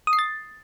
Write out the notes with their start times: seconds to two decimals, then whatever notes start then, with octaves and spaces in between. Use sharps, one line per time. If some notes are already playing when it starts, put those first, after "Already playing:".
0.07 D#6
0.13 C7
0.19 A6